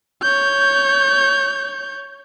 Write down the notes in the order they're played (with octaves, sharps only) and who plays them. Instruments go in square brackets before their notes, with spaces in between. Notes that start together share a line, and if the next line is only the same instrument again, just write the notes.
[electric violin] C#5 G6